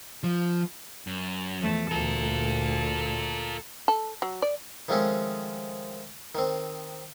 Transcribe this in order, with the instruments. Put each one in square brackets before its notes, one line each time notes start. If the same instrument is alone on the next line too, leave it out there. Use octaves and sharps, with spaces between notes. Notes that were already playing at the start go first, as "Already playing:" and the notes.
[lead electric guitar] F3
F#2
[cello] E2 A3 [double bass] F3
[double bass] D2 A#2 [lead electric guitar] F4 A#4 [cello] A4
[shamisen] A4
F#3
D5
[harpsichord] D#3 F3 G#3 A3 C4 C#4
D#3 C4